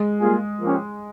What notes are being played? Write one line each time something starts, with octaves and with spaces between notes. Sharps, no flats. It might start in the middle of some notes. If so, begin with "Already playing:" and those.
Already playing: G#3
G3 A#3 F4 G#4
F3 A#3 C#4 G4